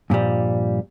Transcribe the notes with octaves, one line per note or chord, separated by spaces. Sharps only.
G2 A#2 F3 G3